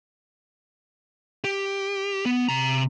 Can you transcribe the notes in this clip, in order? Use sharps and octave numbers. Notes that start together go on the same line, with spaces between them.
G4
B3
C3 A#5